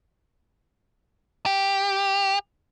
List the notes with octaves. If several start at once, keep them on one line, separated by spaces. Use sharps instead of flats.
G4